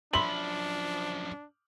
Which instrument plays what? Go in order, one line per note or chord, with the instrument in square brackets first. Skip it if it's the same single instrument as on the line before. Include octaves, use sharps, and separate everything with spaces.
[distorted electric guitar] F#2 F3 [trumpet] D4 [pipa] E5 B5 C6 [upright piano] F#7